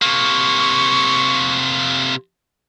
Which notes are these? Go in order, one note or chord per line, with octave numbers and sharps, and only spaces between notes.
C3 A#3 C#6